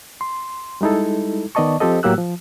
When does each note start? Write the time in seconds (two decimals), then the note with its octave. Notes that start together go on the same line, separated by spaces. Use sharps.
0.21 C6
0.81 G3 G#3 D#4 E4 A4
1.55 D#3 B3 D5 D#5 A5 C#6
1.80 F3 C4 G4 A4 D#5
2.03 A2 F#3 A#3 G4 E6 F#6
2.18 F3